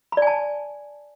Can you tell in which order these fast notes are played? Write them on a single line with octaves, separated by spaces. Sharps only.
B5 D5 G#5 A5